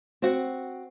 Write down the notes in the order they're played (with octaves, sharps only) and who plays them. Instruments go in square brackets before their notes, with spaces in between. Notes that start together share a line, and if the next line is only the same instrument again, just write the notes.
[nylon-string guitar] C4 F#4